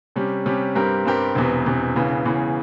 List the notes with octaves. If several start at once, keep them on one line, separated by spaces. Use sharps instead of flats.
C3 G3 C#4
C3 G3 C#4
G2 G3 C4 G4 A#4
G2 G3 C4 G4 A#4
E1 E2 C3
E1 E2 C3
E1 E2 C#3 E3
E1 E2 C#3 E3